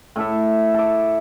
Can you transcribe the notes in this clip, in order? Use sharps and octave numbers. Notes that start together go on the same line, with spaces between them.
A2 E4 A4 E5
A4 D6